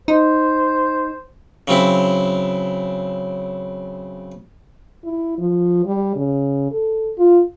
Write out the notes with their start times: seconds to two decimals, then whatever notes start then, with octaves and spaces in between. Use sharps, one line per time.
0.08 D#4 C5
1.68 C#3 F#3 C4 E4
5.04 E4
5.38 F3
5.85 G3
6.16 C#3
6.71 A4
7.18 F4